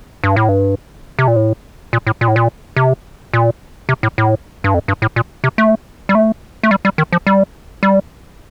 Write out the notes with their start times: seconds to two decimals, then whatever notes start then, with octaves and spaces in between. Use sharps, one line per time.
0.24 G2
0.36 A2
0.49 G2
1.19 C3
1.28 A#2
1.36 A2
1.93 A#2
2.07 A2
2.21 A#2
2.28 A2
2.36 A#2
2.76 C3
3.34 A#2
3.89 C3
4.03 A2
4.18 A2
4.64 G2
4.74 F2
4.88 G2
5.02 A2
5.16 A#2
5.44 C3
5.58 A3
6.09 G3
6.15 A3
6.63 A3
6.71 G3
6.85 G3
6.98 D#3
7.13 F3
7.27 G3
7.83 G3